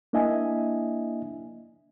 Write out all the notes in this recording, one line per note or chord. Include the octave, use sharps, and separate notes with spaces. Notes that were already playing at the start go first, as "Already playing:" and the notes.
A#3 D4 E4 D#5 E5 G#5